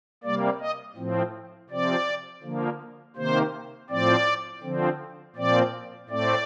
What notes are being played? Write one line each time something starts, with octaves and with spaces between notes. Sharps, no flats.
C3 G3 A#3 D5
D#5
A2 F3 C4
C3 F3 C4 D5
D3 F3 A#3
C3 D#3 A#3 C5
A2 F3 C4 D5
D3 F3 C4
A#2 F3 C4 D5
A2 A3 C4 D5